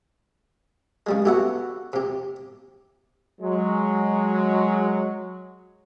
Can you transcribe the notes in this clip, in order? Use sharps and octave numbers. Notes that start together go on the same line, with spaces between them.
C#3 G3 G#3
B3 F#4 G4 A4 E5 F#5
C3 G4
F#3 G#3